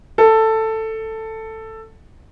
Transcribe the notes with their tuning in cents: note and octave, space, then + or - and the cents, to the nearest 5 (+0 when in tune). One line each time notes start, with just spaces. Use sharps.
A4 +10